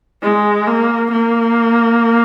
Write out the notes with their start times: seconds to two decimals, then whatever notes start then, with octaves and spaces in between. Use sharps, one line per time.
0.22 G#3
0.67 A#3
1.12 A#3